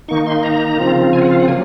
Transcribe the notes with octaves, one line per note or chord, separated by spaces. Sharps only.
D#3 A#3 D#4 C#6
C6
A#5
C#3 F3 C4 F4
G#5
F#5
F5
F#5
F#3 A#3 G#5